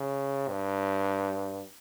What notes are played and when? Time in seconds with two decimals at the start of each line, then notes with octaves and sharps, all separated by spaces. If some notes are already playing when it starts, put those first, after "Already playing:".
Already playing: C#3
0.48 G2